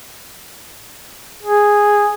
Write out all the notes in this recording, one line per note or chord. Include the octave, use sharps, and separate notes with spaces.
G#4